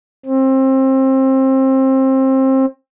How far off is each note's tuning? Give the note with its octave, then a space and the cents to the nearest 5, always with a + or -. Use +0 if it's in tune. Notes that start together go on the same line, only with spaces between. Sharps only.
C4 +25